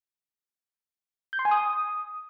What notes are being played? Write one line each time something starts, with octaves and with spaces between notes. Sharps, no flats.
G6
C6
G#5
D#6